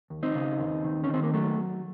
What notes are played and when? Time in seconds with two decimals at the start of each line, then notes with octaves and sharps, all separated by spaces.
0.10 D#2
0.23 C4 D#4
0.35 C#3
0.59 D#2
0.84 D#3
1.04 C#4
1.09 D#3 C4
1.24 A#3
1.34 F#3 A3